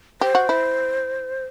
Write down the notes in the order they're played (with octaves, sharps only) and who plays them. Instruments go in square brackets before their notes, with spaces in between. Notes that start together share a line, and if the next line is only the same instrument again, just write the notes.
[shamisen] G4 [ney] C5
[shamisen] F#4
E4